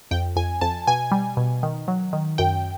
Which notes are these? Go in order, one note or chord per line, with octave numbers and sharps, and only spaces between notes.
F2 G5
F2 G#5
F2 A5
B2 G#5
G3
B2
D#3
F#3
D#3
F#2 G5